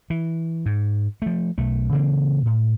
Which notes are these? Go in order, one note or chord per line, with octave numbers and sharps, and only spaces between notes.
E3
G#2
F3 A3
B1 A3
C#3 E3 A#3 C4
A2